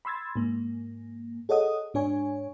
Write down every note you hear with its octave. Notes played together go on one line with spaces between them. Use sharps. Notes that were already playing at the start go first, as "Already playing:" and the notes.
B5 C6 E6 G#6 A6
G#2 A#3
G#4 A4 C#5 D#5 F#5 D#6
G#2 D4 C#5 G#5 C#6